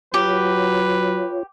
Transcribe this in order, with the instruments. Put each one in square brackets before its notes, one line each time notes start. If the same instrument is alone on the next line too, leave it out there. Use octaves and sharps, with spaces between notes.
[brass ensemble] F#3 [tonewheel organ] F4 C#5 [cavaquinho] G4 [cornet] B4